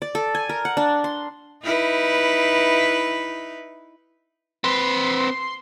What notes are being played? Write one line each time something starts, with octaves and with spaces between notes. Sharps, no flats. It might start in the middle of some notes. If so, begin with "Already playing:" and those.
D5
A4
G#5
A#4
F#5
D4
C6
D#4 E4 B4
C4 B4 C6